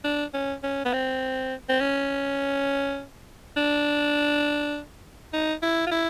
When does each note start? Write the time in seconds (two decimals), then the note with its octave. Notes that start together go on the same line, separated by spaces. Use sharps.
0.04 D4
0.34 C#4
0.63 C#4
0.85 B3
0.93 C4
1.69 C4
1.80 C#4
3.57 D4
5.33 D#4
5.62 E4
5.87 F4
5.91 E4